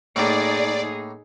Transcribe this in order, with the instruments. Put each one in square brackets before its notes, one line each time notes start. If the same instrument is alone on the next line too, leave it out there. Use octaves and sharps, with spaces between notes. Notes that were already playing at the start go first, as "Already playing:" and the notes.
[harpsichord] A2 A#3 G5 [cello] D#4 G#4 [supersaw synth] D5